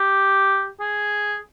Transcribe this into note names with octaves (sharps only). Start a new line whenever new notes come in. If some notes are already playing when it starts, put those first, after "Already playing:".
Already playing: G4
G#4